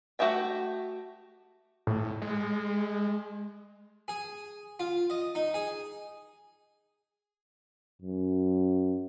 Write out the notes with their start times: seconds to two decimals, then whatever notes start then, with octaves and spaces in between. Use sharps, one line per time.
0.19 A3 F#4 G4 E5 G5
1.87 A2
2.22 G#3
4.08 G#4
4.80 F4
5.10 D#5
5.35 D#4
5.54 G#4
8.02 F#2